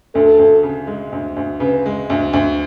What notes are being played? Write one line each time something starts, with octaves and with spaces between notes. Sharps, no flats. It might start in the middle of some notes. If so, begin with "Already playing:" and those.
D2 A4
D2
C#3
G#3
D2
D2
C#3 B4
G#3
D2
D2